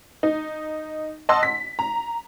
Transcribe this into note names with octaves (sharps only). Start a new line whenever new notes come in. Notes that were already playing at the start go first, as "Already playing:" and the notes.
D#4
D#5 F#5 A5 C6 E6
B6
A#5